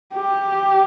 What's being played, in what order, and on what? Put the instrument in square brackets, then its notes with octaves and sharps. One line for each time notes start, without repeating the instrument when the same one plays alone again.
[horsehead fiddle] G4